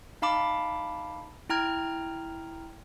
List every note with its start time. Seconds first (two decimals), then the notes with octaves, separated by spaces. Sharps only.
0.22 D#4 F5 A5 B5 D6
1.49 E4 G5 A#5 F6 G#6